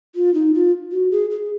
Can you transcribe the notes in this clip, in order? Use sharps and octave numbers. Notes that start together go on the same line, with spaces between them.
F4
D#4
F4
F#4
G#4
G#4